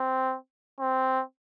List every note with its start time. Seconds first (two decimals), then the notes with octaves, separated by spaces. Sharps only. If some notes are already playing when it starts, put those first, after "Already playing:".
Already playing: C4
0.80 C4